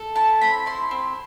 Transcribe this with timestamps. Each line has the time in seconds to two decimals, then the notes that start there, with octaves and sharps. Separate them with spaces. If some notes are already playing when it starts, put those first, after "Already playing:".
Already playing: A4
0.16 E4 A5
0.41 C4 B5
0.66 E4 C6
0.91 C4